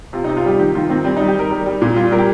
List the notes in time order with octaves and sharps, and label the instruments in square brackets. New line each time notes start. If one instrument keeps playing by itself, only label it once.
[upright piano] C3 F4
D#4
C3
F4
G3 G4
D#3 G4
D#3 F4
D#3 C4
G3 C4
D#4
G3
G4
G3 A#4
G3 A#4
G3
A#2
G3 F4
G3 A#4
G4